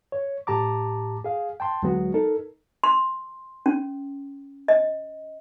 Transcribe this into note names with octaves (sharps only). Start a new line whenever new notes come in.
C#5
A2 G4 A5 A#5 D6
G#4 F5
G5 A5 C6
D2 F#3 G#3 B3 F#4
D#4 A4 A#4
C6
C#4
D#5